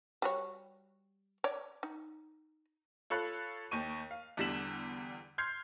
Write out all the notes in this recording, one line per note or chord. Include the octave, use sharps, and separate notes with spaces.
G3 F#4 C#5
C#5 D5
D#4
F4 A4 C#5 B5 F#6
D#2 G5 C#6 D#7
F5
E2 D3 G3 B6 E7 F#7
C6 F6 G6 G#6 C7